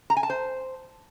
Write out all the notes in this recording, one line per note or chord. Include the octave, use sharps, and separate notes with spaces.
A#5
G#5
A5
C5